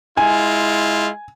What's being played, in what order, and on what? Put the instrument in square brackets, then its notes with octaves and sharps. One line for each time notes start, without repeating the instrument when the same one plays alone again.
[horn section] G#3 E4 F4 [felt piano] G#5